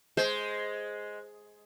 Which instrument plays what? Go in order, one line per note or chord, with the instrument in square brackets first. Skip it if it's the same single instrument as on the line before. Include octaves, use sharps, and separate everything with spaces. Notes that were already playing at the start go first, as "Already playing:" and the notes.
[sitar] G#3 [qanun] C5